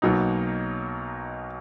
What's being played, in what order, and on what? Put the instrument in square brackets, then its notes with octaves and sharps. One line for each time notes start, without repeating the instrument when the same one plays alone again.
[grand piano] B1 B2 F#3 A#3 D#4